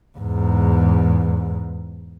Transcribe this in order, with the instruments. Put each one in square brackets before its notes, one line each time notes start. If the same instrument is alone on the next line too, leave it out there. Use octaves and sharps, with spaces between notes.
[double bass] E2 G#2